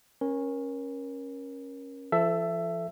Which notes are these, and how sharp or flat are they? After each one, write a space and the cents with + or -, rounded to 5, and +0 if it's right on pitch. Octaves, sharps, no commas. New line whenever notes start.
C#4 -15 A#4 +20
F3 -35 A4 +0 E5 +15